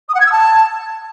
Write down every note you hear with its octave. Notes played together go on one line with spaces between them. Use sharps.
D#6
F#5
G#6
E6
A5